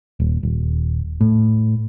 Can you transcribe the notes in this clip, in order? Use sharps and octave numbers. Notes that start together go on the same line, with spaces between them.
D#1
D#1
A2